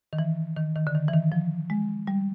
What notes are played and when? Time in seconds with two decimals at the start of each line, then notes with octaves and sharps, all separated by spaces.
0.13 D#3
0.19 E3
0.57 D#3
0.76 D#3
0.87 D3
0.95 D#3
1.09 E3
1.13 D#3
1.32 F3
1.70 G#3
2.07 G3